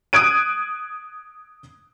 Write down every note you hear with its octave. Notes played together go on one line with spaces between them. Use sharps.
D#6 F#6 G#6 D7 D#7